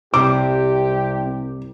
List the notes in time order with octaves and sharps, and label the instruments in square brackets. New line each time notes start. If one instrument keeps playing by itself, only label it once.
[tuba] C2 [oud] C3 G3 [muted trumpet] G4 [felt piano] D6